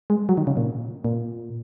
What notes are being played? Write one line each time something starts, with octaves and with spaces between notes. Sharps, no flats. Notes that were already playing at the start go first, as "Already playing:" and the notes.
G#3
F#3
D#3
C#3
A#2
A#2